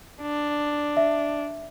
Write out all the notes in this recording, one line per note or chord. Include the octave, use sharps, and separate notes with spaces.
D4
E5